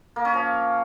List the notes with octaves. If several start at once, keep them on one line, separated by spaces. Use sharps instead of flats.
A#3
C#4
F3